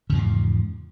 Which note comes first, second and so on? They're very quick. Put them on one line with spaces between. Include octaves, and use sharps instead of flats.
C#3 E2 F3 G#2